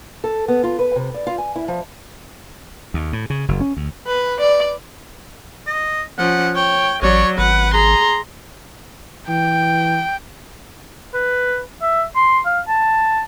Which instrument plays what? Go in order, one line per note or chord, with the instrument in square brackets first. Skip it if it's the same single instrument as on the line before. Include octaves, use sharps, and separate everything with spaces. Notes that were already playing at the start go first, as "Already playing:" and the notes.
[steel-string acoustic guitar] A4
B3
F4
B4
C3
D5
F4
G#5
E4
F3
[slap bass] D#2
A2
C#3
F#1
C#4
D2
[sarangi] B4
D5
[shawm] D#5
[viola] F3 C#4 [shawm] F#5
[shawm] C#5 [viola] G5
[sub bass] A1 [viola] F#3 D5 [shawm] C#5
[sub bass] G#1 [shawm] B4 [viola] F#5
[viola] G#4 C6 [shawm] A#5
[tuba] E3 [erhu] G5
[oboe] B4
E5
C6
F5
A5